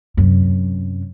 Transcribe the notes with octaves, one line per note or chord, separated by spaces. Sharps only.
F#2 C3